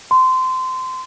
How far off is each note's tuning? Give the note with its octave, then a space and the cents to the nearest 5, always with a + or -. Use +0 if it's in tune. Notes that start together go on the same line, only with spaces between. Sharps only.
C6 -20